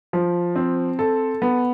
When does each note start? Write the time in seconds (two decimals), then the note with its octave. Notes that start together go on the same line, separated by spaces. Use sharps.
0.13 F3
0.56 C4
0.99 A4
1.42 B3